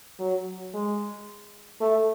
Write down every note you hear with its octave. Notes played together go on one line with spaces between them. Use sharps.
F#3
G#3
A3